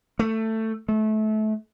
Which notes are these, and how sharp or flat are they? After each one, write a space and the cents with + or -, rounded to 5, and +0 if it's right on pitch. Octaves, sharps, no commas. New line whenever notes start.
A3 +15
A3 -25